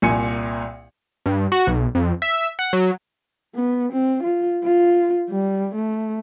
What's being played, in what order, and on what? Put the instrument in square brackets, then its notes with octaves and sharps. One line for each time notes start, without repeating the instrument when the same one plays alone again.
[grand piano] C2 A#2 G#5 C#7
[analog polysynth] G2
F#4
B1
F2
E5
F#5
F#3
[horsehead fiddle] B3
C4
F4
F4
G3
A3